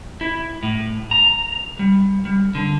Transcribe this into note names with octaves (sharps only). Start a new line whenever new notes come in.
E4
A2
A#5
G3
G3
D3